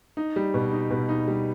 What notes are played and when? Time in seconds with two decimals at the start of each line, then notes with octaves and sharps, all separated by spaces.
0.17 D#4
0.36 G3
0.54 B2
0.73 D#4
0.91 B2
1.09 D#4
1.27 G3